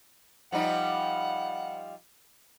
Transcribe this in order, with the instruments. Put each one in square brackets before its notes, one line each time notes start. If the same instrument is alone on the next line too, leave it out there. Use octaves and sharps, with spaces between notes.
[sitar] F3 G3 D#4 [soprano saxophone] F#5